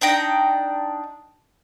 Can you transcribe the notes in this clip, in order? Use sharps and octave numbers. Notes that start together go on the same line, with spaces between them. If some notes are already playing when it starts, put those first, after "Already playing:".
D4 D#4 G5 A#5